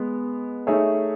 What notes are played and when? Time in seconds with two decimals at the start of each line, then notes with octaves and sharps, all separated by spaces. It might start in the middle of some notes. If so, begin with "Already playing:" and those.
Already playing: G#3 B3
0.67 A3 D#4 G#4 C#5 E5